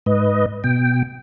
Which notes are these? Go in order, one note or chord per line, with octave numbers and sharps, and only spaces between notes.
G#2 B4 D#5
B2 G5